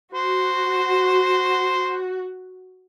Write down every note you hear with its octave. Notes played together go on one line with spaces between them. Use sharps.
F#4 C5